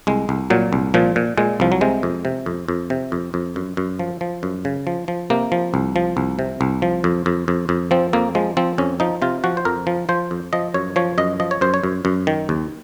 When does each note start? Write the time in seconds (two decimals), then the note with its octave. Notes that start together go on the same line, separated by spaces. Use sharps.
0.07 C2 G#3
0.29 C2
0.50 A#2 F#3
0.73 C2
0.94 A#2 F3
1.16 A#2
1.37 A#2 G#3
1.60 C2 F3
1.72 F#3
1.81 C3 G#3
2.03 F2
2.25 C3
2.46 F2
2.68 F2
2.90 C3
3.12 F2
3.34 F2
3.56 F#2
3.77 F#2
3.99 F3
4.21 F3
4.43 F#2
4.65 C#3
4.87 F3
5.08 F3
5.30 C3 A#3
5.52 F3
5.74 C2
5.96 F3
6.17 C2
6.39 C3
6.61 C2
6.82 F3
7.04 F2
7.26 F2
7.48 F2
7.69 F2
7.91 F3 C4
8.13 F2 A#3
8.35 F3 G#3
8.57 F3 C4
8.78 F2 C#4
9.00 F3 D#4
9.22 C3 F4
9.44 F3 F#4
9.57 C5
9.65 F2 A#4
9.87 F3
10.09 F3 C5
10.31 F2
10.53 F3 D#5
10.74 F#2 C#5
10.96 F3 C#5
11.18 F#2 D#5
11.40 F3 D#5
11.51 C#5
11.61 F#2 C5
11.74 C#5
11.84 F#2
12.05 F#2
12.27 D#3
12.49 D#2